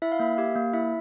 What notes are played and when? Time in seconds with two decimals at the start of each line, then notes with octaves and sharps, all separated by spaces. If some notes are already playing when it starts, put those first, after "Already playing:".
0.02 E4 E5
0.12 F5
0.19 A#3 E5
0.37 G4 F5
0.56 A#3
0.73 E4 E5